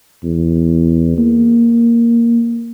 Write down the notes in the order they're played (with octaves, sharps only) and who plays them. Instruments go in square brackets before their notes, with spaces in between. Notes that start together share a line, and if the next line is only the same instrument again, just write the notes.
[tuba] E2
A#3